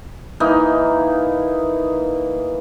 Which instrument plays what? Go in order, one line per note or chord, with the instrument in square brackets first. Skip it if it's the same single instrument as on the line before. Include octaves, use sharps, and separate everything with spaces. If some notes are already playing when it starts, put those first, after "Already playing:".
[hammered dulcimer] E3 A#3 D#4